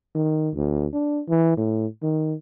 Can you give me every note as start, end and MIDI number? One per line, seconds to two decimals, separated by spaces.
0.15 0.49 51
0.55 0.86 38
0.93 1.21 62
1.28 1.55 52
1.57 1.86 45
2.03 2.34 51